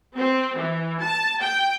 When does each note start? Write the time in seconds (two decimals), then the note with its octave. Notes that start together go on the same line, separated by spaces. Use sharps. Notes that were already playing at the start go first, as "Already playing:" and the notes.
0.16 C4
0.58 E3
1.03 A5
1.41 G5